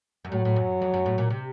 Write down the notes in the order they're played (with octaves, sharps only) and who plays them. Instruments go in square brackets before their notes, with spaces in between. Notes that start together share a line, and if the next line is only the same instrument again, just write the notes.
[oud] F#2
[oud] A2 [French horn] F#3
[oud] A2
F#2
F2
F#2
A2
A#2
C3